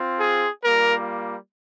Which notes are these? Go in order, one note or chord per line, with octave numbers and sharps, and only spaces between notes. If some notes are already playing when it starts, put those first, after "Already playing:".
Already playing: C4 F4
G#4
G3 A#3 F4 A#4